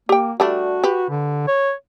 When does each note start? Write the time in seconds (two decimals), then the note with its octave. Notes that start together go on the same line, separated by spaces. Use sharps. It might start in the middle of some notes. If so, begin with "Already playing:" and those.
0.09 A#3 G4 G5
0.40 G3 A3 D4 F#4
0.84 G4 B4
1.09 D3
1.47 C#5